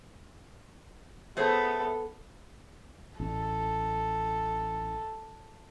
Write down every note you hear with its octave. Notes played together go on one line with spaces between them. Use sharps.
A3 B3 G#4 A4 C5
A1 A4